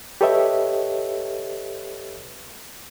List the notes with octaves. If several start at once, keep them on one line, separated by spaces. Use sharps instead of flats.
G4 A4 B4 C#5 D#5 E5